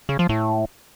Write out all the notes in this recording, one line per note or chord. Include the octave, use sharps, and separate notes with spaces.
C#3
F3
A2